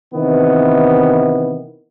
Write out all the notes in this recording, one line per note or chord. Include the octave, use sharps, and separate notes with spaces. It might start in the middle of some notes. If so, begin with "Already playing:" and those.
C3 D#3 E3 B3